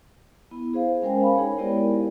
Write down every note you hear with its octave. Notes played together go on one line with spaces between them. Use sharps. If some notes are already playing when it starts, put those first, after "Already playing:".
B3 E4
G#4 C5 F5
G#3 C#4 A#4 C5 G5 G#5
F5 B5
D#4 G#4 A#4 C#5
G#3 B3 E4 G4 A#4 D5